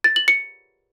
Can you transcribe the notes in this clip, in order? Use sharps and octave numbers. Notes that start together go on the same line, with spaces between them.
A6
F#7
C#7